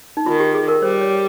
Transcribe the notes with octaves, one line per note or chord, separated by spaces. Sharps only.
D#4
D#3 F4
G4
G#4
A#4
G3 C5
C#5